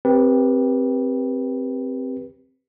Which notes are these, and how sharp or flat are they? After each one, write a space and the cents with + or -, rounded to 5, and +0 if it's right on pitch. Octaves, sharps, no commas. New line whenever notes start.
C4 +0 G4 +10 B4 -30